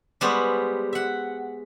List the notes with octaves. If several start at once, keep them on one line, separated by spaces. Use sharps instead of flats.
G3 G#3 B3 C5 C#5
E5 F#5